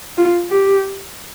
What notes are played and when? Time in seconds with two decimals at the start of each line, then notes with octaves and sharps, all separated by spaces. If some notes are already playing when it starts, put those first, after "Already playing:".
0.17 F4
0.50 G4